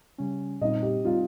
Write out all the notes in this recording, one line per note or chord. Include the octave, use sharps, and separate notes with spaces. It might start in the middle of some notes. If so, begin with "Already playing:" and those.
C#3 G3 C#4
A#2 G3 C4 D#4 D#5
G4
G3 C4 D#4 F4